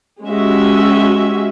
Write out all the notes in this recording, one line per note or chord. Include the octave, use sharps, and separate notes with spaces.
G#3 C#4 F#4 G4 E5